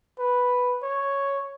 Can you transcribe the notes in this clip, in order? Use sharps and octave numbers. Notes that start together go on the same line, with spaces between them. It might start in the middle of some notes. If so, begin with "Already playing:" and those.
B4
C#5